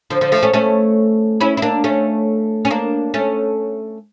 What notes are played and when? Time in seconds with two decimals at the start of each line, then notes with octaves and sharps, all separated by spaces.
0.10 D3 F3
0.21 D3 F3
0.32 F3 A3
0.43 A3 C#4
0.53 A3 C#4
1.40 C#4 E4
1.57 E4
1.62 A#3 D4
1.84 A3 C#4
2.65 C#4
2.71 A#3 D4
3.14 A3 C#4